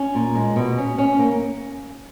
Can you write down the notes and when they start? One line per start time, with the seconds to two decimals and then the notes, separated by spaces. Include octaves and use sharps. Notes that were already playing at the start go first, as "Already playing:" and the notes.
Already playing: C#4
0.15 A#2
0.35 G#3
0.56 B2
0.78 C#4
0.98 C#4
1.19 A#3